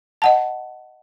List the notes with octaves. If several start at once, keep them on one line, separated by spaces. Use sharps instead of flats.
D#5 F#5 A5